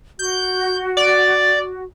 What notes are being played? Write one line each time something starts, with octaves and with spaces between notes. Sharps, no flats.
F#4 G6
D5